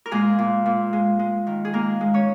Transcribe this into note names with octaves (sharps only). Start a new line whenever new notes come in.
A#4
A#2 G#3 G#4
A#2
A#2
G#3
G#3
D#3
G#4
G#3 A#3 A#4
G#3
C#4 C#5